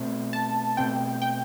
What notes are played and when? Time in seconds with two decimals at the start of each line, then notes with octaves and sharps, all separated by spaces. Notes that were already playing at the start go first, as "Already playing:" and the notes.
Already playing: B2 A3 C4
0.33 A5
0.77 B2 A3 C4 G5
1.22 G5